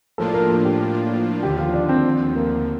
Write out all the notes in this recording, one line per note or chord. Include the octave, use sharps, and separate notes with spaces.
A2 F3 A#3 D4 F4 A4
A#4
A4
G4
D#2 D3 F3 G4
F4
D4
C4
A#3